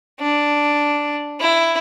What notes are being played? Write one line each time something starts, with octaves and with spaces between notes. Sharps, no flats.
D4
E4